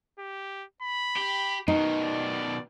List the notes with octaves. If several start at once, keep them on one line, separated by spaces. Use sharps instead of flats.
G4
B5
G4
B2 D#3 D#4
D5